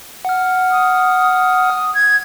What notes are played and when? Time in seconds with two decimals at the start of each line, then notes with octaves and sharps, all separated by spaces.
0.25 F#5 F6
0.71 D#6
1.95 G#6